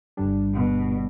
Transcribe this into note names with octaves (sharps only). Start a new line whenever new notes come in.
G1 G2 D3 G3 D4
B2